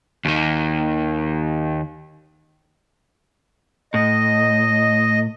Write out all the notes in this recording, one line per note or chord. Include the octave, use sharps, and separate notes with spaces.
D#2 D#3
A2 D#5